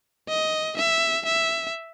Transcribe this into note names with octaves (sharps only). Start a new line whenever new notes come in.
D#5
E5
E5